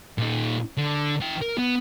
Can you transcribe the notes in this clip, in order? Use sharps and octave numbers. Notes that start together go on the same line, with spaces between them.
A#2 D#4
D3
E3 G5
A#4
B3